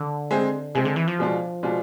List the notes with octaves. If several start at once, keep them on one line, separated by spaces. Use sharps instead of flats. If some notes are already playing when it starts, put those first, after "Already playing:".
Already playing: D3
G#3 C4 G#4
C3 G#3 C4 G#4
D3
E3
F3
B2 G#3 D4 F4
B2 G#3 D4 F4